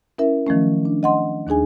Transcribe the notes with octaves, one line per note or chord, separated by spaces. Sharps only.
C#4 E4 A#4 E5
D#3 F3 F#3 A3 C#4
D4
D#5 F#5 C6
D#2 D4 D#4 G#4 G#5